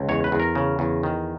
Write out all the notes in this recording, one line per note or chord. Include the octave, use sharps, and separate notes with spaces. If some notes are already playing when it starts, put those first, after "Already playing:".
Already playing: C#2
E2 C#5
B4
E2
A#4
C#3
E2
D#3